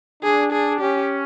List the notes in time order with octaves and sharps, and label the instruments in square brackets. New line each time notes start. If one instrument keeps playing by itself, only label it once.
[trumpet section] D4 [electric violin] G#4
[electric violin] G#4
[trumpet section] C#4 [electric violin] G4